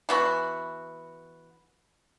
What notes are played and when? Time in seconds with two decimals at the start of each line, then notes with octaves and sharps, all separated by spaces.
0.09 E3 B3 F#4